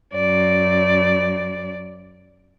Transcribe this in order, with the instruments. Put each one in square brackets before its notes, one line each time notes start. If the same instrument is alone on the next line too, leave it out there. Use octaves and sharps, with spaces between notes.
[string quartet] F#2 D5